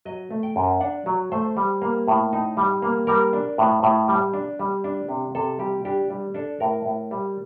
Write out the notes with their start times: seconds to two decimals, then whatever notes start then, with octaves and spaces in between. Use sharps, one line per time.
0.05 F#3 D#5
0.31 A3
0.43 G5
0.56 F#2
0.80 D4 F#5
1.06 F#3
1.32 A3 C5
1.57 G3
1.82 A#3
2.08 A2
2.33 D#4
2.57 G3
2.82 A#3
3.07 G3 A#4
3.33 D4
3.58 A2
3.83 A2
4.08 G3
4.34 D4
4.59 G3
4.84 D4
5.09 C3
5.35 C3 A4
5.59 G3 G4
5.85 D4 G4
6.10 G3
6.35 D4 A4
6.60 A2 A#4
6.85 A2
7.11 G3